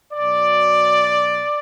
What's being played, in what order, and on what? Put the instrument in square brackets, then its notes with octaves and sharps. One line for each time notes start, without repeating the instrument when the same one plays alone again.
[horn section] B2 F#3 D5